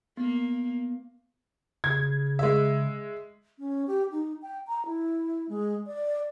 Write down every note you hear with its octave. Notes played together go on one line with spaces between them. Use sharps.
A#3 B3
C#3 G#6
G#3 E5
C#4
G4
D#4
G5
A#5
E4
G#3
D5